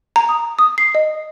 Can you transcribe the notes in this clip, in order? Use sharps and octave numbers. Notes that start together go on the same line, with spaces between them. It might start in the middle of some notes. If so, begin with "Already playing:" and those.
A#5
D#6
D#6
C7
D#5